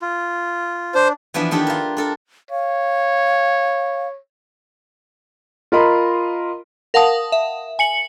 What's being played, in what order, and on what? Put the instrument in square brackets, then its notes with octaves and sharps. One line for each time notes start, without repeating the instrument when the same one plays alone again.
[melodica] F4
[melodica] D4 [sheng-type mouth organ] C5
[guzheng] E3 F3 B3 D4 E5
D#3 D4 E4 G4 A4
F4 A#4
D4 A4 A#4
[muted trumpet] C#5 [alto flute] F5
[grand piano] F4 A#4 D#5 B5 C6
[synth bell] A#4 F5 F#5 A5 D#6
E5
G#5 C#7 F#7